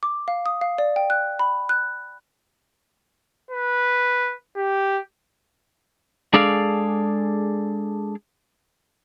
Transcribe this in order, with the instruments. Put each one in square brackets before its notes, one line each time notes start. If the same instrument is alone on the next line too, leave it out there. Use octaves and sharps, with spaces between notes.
[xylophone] D6
F5
D#6
F5
D5
G5
F#6
B5
F#6
[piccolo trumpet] B4
G4
[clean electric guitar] G#3 D4 G#4 A4 D5 F5